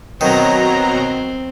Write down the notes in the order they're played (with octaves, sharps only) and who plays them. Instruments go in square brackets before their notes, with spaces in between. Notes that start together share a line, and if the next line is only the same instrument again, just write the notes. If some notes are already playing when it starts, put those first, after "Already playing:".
[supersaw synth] B2 F#3 A#5 [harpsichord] D#3 [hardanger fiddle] C4